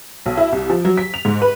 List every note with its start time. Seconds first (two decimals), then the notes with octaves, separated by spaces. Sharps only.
0.26 B1
0.37 E4
0.53 C2
0.70 F3
0.85 F#3
0.97 B6
1.14 F7
1.25 G#2
1.42 B4